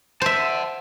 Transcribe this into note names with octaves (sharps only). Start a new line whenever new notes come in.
C5 E5 F#5 A5